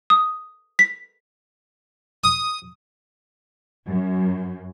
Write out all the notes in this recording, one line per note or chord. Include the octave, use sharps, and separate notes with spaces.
D#6
B6
D#6
F#2